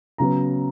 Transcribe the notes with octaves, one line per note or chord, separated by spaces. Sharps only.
C#3 F#3 B3 A#5